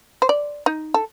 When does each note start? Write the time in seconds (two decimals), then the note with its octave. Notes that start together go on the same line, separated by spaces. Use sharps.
0.22 C5
0.29 D5
0.66 D#4
0.94 A4